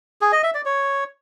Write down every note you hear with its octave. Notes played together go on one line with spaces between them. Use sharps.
G#4
D#5
E5
D5
C#5